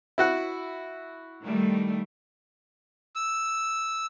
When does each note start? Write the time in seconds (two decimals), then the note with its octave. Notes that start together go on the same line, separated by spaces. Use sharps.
0.18 E4 F#4 F#5
1.43 D#3 G3 A3
3.16 E6